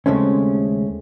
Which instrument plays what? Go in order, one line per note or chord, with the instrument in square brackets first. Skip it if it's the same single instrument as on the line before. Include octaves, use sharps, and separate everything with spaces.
[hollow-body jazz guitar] D#2 C#3 G#3 A3 C4 C#4